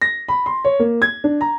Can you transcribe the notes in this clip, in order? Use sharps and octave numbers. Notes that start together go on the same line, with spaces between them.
A#6
B5
C6
C#5
A#3
G#6
D4
A#5